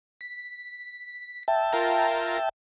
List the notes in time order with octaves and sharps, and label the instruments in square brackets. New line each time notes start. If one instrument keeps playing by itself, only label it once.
[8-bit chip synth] B6
[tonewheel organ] E5 G5 A5
[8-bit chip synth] F4 A#4 A#5